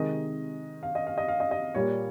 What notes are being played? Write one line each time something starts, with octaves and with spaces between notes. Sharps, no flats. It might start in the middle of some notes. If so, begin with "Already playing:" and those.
Already playing: C3 D#3 G#3 D#5
F5
D#5
F5
D#5
F5
D#5
D#5
A#2 G3 A#3 C#5